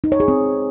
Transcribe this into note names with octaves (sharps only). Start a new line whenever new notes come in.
D#4
C#5
G#4
C4